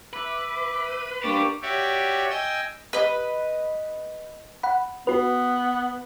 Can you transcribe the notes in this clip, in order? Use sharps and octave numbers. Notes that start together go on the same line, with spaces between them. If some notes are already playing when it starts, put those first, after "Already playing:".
B4 E5 D6 E6
D#7
A#3 D4 G4 D5 C#6
F#4 G4 C#5 D5 E5
D#5 G5 G#5 E6
B4 D#5
F#5 B5
B3 F#4 B4